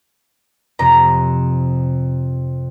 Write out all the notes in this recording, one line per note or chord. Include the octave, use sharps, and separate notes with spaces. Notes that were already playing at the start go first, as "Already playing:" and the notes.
F2 C3 A#5